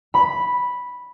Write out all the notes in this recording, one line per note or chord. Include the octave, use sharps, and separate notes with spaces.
B5